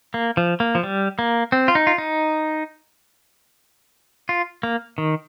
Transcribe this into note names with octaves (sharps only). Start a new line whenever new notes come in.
A#3
F3
A#3
F3
G3
A#3
C4
F4
D#4
F4
D#4
F4
A#3
D#3